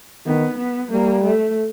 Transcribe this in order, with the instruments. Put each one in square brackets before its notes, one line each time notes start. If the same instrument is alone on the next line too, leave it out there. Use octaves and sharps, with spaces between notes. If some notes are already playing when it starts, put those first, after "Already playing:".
[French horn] D#3 [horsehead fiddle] B3
[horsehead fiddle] B3
[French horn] G3 [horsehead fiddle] A#3
[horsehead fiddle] A3